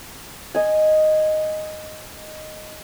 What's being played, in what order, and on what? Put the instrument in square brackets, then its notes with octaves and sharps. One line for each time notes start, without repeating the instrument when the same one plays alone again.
[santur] D#5 G#5